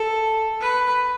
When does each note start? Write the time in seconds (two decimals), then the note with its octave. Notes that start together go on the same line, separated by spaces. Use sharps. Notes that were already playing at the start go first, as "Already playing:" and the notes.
Already playing: A4
0.61 B4